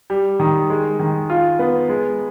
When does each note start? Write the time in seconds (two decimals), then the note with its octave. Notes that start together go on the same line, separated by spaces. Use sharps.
0.10 G3
0.40 D#3
0.70 G#3
1.00 D#3
1.30 F4
1.59 B3
1.89 G#3